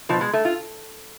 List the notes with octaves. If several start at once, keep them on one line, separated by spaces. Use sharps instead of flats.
B2 F3
G#3
A3
F4